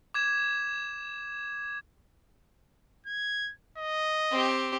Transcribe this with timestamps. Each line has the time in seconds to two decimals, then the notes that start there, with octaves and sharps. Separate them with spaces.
0.14 D6 G#6 E7
3.06 G#6
3.78 D#5
4.32 C4 G4